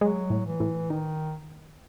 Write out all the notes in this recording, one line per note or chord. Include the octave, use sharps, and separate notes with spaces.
F#3 G#3
A2
E3
A2
D#3 D#4